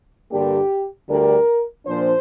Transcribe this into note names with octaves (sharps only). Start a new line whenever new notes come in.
G2 D3 A#3 D4 G4
D2 D3 G3 D4 A#4
A#2 F3 D4 C5